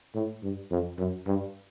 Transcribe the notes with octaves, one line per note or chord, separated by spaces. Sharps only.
A2
G2
F2
F#2
G2